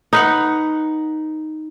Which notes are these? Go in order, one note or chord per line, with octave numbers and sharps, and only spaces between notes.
D#4 B4 F#5